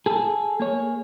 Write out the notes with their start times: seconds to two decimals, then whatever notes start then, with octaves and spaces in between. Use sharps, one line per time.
0.06 G#4 A4
0.60 A#3 G#4 C#5